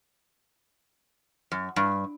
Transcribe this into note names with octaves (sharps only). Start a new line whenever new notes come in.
F#2
G2